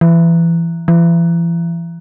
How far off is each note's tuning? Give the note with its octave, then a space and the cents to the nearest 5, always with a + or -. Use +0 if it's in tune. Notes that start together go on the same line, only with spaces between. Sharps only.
E3 +25
E3 +40